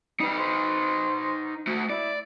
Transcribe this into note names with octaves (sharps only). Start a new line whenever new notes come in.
G3 D#4 B4
C5
A3 F#4
E4 D5